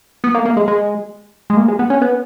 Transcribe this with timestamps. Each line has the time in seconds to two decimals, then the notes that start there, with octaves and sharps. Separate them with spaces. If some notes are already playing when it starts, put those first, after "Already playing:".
0.24 B3
0.35 A#3
0.46 A#3
0.57 G#3
0.68 G#3
1.50 G#3
1.57 A#3
1.68 G#3
1.79 B3
1.90 C#4
2.02 B3